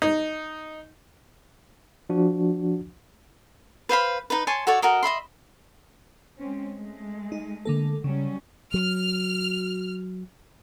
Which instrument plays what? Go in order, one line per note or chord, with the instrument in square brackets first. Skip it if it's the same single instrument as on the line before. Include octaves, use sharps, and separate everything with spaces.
[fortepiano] D#4
[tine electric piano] F3 D4 F#4
[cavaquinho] B4 C5 F5 B5
D#4 B4
C#5 G#5 A5 C6
F#4 A4 C#5 D5
F#4 A4 A#4 D#5
D#5 E5 B5 C6
[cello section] G#3 C4 C#4
G#3 A3
[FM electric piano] D#4
D3 A#3 A4
[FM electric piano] C#3 [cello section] F#3 G3 C#4
[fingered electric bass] F#3 [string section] F6